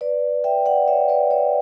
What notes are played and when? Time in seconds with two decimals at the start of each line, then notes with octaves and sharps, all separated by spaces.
0.01 B4 D5
0.44 E5 G5
0.66 D5 F#5
0.88 C#5 E5
1.09 B4 D5
1.31 C#5 E5